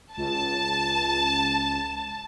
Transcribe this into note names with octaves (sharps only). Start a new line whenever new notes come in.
C#2 A5